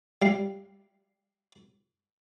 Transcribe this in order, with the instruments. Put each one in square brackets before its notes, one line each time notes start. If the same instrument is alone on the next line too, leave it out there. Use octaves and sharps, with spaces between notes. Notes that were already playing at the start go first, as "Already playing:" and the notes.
[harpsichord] G3 F5